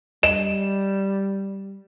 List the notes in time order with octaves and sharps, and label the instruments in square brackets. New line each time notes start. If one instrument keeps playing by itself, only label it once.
[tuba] G3 [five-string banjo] D#5 [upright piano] E7